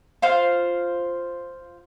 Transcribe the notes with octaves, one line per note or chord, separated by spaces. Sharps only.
F4 C5 F5